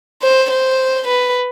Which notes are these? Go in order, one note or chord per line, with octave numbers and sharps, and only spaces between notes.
C5
C5
B4